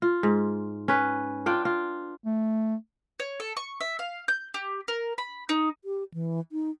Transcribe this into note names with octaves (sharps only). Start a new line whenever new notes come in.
F4
G#2
C#4 B4
D4 F4 G5
F4
A3
C#5
A4
C#6
E5
F5
G6
G4
A#4
B5
D#4
G4
E3
D#4